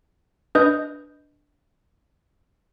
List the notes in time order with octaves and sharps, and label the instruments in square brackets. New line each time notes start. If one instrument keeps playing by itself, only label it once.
[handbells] D4 B4 D#5 D#6 G6